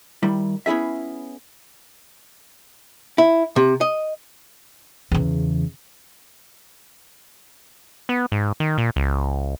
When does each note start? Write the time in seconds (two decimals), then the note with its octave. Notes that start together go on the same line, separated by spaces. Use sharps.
0.23 D#3 G3 E4
0.66 B3 C#4 E4 G#4 E5
3.18 E4
3.56 C3
3.81 D#5
5.11 E2 C#3
8.09 B3
8.32 G#2
8.60 D#3
8.78 A#2
8.96 C#2